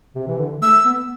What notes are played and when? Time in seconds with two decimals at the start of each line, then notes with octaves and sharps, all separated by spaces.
0.15 C3
0.27 E3
0.39 D3
0.62 A3 E6
0.85 B3